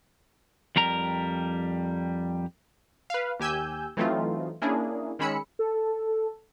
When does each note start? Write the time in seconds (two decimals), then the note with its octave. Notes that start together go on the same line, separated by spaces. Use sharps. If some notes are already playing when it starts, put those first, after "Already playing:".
0.76 F2 G3 A#4 A#5
3.10 B4 F5
3.40 D#2 G4 G#5 E6 G6
3.97 E3 F#3 A3 C4 D#4 F4
4.62 A#3 C#4 D4 E4 G#4
5.19 D#3 G#3 C#4 B5 E6 C#7
5.59 A4